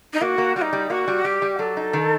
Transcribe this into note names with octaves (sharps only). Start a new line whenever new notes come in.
D#4
A#3 F#4
A#3
G3 F#4
D#4
G3
A#3 F#4
G3
G3 G4
G3
F#3 A4
D#4
D#3